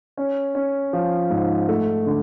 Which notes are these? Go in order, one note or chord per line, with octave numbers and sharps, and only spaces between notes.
C#4
C#4
F3
G#2
A3
D3